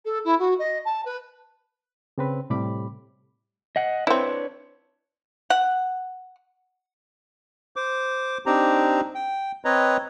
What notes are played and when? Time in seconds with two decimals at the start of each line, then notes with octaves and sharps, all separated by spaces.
0.05 A4
0.24 E4
0.39 F#4
0.59 D#5
0.85 A5
1.05 B4
2.18 C#3 C4 B4
2.50 A2 C3 G3 B5 D6
3.76 D#5 F#5
4.07 C4 D4 E4 B4 C#5
5.50 F#5
7.76 C5 D6
8.46 C4 D4 D#4 G4 C5 A#5
9.15 G5
9.65 C4 B4 C#5 D#5 A#5